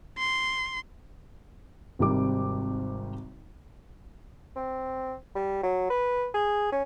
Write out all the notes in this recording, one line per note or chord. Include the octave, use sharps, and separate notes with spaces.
C6
G#1 C3 D#3 G3 D6
C4
G3
F#3
B4
G#4
C#4